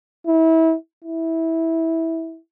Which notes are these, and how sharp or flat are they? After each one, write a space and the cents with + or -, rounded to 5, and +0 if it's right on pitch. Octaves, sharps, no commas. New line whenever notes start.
E4 -30
E4 -15